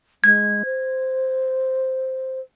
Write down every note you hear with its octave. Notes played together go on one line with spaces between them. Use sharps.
G#3 G#6
C5